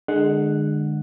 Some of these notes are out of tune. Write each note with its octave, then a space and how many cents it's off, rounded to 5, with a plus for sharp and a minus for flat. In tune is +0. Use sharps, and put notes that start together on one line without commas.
D3 +35 G#3 +0 F#5 +0